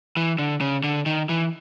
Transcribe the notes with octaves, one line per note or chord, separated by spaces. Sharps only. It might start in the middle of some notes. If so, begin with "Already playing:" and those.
E3
D3
C#3
D3
D#3
E3